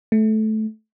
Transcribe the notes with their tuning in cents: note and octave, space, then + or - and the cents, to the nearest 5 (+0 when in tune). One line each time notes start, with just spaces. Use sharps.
A3 -15